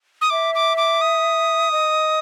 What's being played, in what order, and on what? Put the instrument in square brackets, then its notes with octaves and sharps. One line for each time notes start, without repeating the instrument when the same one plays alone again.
[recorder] D#6
[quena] E5 [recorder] D6
[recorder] D6
D6
D#6
[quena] D#5